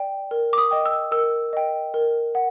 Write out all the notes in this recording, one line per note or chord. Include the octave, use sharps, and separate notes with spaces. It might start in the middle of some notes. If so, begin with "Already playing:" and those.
Already playing: D5 G5
A#4
D6
D#6
D#5 G5
E6
A#4 E6
D#5 G5
A#4
F#5